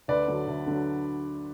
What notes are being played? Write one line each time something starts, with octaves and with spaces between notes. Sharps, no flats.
D2 B4 D5
D3 F#3
D2
D3 F#3